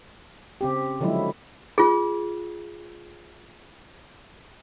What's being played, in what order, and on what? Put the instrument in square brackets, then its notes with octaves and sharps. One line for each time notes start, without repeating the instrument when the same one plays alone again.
[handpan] C#3 C4 G4
D3 F3 F#3 G#3 E4
[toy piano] F4 G#4